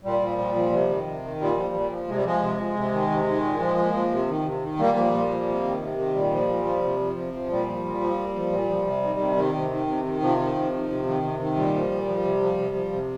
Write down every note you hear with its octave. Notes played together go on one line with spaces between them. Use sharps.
A#2 G3
F3
A#2
F3
C3
D#3
C3
D#3
A#2 G3
F3
A#2
F3
C3 G#3
G3
F3 G#3
C3
F3
C3
D#3
C3
D#3
A#2
F3
A#2
F3
C3
D#3
C3
D#3
A#2 G3 A#3
F3
A#2
F3
C3
D#3
C3
D#3
A#2 G3
F3
A#2
F3
C3
F3
C3
F3
A#2 G3
F3
A#2
F3
A#2
F3
A#2
F3
C3
D#3
C3
D#3
C3
D#3
C3
D#3
C3 F3
D#3
C3
D#3
C3
D#3
C3
D#3
A#2 G3
F3
A#2
F3
C3
F3
C3
F3
C3